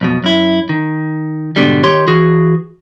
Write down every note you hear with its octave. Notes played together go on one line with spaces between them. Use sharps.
B1 F2 B2
F#2 E4
D#3
G#2 B2 D3 G3
D#3 G4 C#5 C6
E3 F#4 G#4